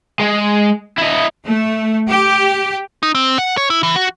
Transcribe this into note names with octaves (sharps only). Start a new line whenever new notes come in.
G#3
E4 D#5
A3
G4
D#4
C4
F#5
C#5
E4
E3
F#4